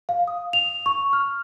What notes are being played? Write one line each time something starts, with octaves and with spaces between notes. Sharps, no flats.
F5
D#6
F7
C#6
F6